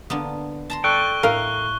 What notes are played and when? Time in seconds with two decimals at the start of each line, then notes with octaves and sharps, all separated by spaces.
0.10 D3 A#3 B3
0.70 A5 A#5 C6
0.84 A4 D5 G5 C#6 F#6 G7
1.23 A2 E4 A#4 F5